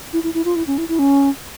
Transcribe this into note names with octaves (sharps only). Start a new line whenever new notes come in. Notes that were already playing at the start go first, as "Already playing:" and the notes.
E4
E4
E4
F4
E4
C#4
E4
E4
C#4